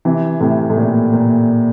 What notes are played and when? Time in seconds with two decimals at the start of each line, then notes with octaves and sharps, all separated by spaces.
0.05 C3 E3
0.41 A2 C3
0.70 A2
0.77 A#2
1.13 A#2